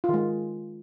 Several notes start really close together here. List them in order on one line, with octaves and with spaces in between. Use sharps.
F4 D#3 G#3